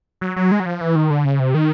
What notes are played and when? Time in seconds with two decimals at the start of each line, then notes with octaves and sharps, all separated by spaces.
0.21 F#3
0.36 F#3
0.52 G#3
0.60 F#3
0.66 F3
0.81 E3
0.96 D#3
1.10 D3
1.25 C#3
1.40 C3
1.55 D#3